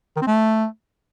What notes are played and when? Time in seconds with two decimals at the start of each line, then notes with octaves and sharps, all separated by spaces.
0.16 D#3
0.22 C4
0.27 A3